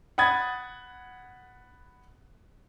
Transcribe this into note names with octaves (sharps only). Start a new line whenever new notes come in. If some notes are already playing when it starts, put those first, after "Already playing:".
F#5 B5 D#6 G#6 A6